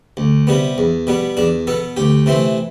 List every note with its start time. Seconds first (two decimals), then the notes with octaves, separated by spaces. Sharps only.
0.17 D2
0.47 C3 G3 B3
0.78 E2
1.07 B2 G3 B3
1.37 E2 D4
1.67 B2 B3 A4
1.97 D2 G4
2.26 C3 E3 A3 C4